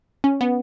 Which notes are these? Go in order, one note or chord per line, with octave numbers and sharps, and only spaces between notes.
C#4
B3